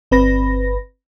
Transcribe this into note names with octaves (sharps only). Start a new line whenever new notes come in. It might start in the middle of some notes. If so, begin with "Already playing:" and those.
G1 C4 B4 B5 A#6